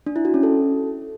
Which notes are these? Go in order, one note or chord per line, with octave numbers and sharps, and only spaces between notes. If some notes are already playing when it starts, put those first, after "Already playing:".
D4
E4
F#4
C#4
A4